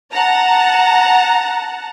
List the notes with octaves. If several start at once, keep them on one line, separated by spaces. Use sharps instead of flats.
F#5 A5 A#5